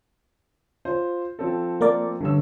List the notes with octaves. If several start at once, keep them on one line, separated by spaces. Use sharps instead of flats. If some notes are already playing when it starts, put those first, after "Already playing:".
F4 C5
F3 C4 A4
A#3 A#4 D5
G2 D3 C#4 E6